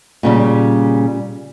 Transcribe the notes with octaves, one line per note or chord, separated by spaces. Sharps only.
A#2 C#3 G3